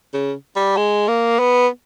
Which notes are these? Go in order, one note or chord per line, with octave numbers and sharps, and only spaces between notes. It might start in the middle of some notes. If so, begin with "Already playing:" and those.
C#3
G3
G#3
A#3
B3